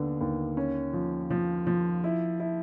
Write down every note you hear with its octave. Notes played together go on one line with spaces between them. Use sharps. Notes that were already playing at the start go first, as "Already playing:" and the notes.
Already playing: D#2 D3 B3
D#2
C#4
F3
F3
F3
E4
E4